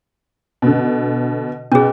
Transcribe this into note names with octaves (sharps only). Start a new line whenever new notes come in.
B2 D3
B2 C#4 G#4